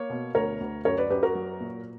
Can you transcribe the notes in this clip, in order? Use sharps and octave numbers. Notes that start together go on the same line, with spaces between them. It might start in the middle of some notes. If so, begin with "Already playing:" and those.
Already playing: A#3 C#5
B2
D2 A#4 C#5
D2
F#2 A#4 C#5
B4 D5
F#2 G4 B4
F#4 A#4
F#3
A#2